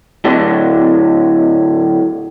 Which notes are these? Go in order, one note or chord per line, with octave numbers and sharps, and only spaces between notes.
A2 D3 F#3